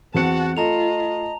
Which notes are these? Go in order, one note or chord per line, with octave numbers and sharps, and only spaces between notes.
E2 C4 F#4 F#5 A5 C#7
A3 F4 D#5 A5 A#5 F7